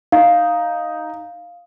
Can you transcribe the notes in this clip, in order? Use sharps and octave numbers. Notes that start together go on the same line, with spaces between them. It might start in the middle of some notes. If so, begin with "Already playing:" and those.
D#4 F5